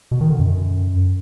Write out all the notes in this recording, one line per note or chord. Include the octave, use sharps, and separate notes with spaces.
B2
D#3
D3
F#2